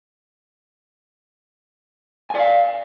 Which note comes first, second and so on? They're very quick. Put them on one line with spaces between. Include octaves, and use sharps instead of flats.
G#5 D5 F5